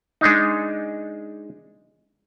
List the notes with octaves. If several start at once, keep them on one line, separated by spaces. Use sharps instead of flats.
G#3 D4 D#4